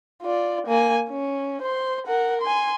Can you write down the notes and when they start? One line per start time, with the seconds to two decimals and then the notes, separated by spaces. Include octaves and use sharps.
0.23 F4 D5
0.67 A#3 G#5
1.09 C#4
1.62 C5 C6
2.07 A#4 F#5
2.42 G#5 C6